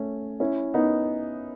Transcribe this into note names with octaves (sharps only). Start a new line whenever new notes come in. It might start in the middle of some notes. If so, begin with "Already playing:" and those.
Already playing: A3 C#4
C#4 E4
B3 D#4